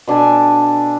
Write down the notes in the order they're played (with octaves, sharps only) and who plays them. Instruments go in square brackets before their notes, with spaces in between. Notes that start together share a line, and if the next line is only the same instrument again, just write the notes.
[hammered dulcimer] B2 D4 A4 G#5